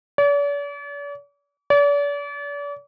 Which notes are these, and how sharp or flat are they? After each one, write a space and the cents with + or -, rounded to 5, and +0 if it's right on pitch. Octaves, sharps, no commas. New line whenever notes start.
D5 -45
D5 -40